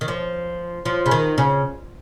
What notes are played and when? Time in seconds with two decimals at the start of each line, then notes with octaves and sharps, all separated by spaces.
0.01 D#3
0.08 F3
0.85 F3
1.06 C#3
1.11 D#3
1.38 C#3